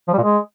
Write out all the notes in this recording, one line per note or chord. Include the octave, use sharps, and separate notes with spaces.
F3
G3
A#2
G#3